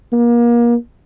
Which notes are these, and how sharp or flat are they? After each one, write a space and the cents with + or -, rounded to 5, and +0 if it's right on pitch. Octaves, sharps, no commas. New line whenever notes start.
A#3 +30